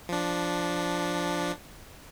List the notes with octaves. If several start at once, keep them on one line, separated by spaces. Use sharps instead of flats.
F3 D4